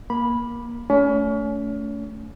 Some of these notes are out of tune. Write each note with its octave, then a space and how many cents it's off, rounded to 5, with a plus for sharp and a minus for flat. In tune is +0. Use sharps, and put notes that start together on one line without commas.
A#3 +20 B5 -10
A3 +0 C#4 +35